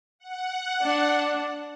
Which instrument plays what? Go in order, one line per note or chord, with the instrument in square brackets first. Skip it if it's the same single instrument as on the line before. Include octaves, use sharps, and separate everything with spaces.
[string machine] F#5
[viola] D4